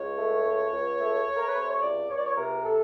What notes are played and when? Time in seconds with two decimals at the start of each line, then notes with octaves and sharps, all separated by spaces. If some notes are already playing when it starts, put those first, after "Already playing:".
Already playing: C#2 C#5
0.17 A3
0.44 C#2
0.73 C#2
1.00 A3
1.27 A3
1.36 A#4
1.47 B4
1.54 C3
1.60 C5
1.71 C#5
1.82 C#2 D5
2.10 C#2 C#5
2.18 D5
2.26 C#5
2.37 C3 A#4
2.65 A4